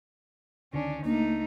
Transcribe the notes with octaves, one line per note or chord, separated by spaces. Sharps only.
C#2 D3 D#3 C#4 D4
C#2 A3 A#3 D4 D#4